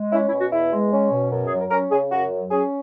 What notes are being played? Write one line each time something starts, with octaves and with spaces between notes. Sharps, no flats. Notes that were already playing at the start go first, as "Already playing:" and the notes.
Already playing: G#3
C#4 E4
E4
B2
F#4
E2 E4
G#3
C#4
B2
F#2
G#4
F#3
A#4
C#4 A#4
C#3 G#4
F#2 F#4
F#3
C#4 G#4